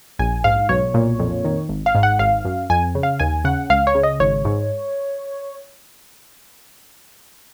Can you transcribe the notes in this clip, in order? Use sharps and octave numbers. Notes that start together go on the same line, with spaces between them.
A#1 G#5
G#2 F5
B1 C#5
A#2
F2
D#3
G#1
F5
G#2
F#5
G#1 F5
F#2
F2 G#5
C#3
F5
D#2 G#5
C#3 F#5
C#2 F5
C#5
C#3
D#5
G#1 C#5
G#2